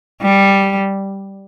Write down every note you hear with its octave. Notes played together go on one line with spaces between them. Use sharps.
G3